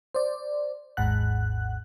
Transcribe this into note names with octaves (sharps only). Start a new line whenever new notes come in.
C5 D5
G#1 D#2 G#2 F#5 F#6